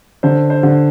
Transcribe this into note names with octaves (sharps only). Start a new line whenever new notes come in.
D3 C5
C5
D3